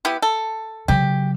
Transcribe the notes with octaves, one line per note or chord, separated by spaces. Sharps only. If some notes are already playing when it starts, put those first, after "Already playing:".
B3 E4 G4
A4
C#3 F#3 G4